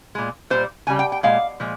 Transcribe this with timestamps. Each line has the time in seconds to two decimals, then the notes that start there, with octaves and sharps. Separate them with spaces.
0.15 A#2 G#3
0.50 A#2 G3 C5
0.87 C#3 G3 G#5
0.99 G5
1.12 G5
1.23 A#2 G#3 F5
1.60 A#2 F3 G#3